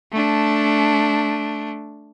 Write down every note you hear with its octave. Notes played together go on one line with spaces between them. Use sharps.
A3 D4